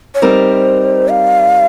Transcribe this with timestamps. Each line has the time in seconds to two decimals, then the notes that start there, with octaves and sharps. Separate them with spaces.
0.15 C#5
0.22 G3 C4 D#4 A#4 C5
1.09 F5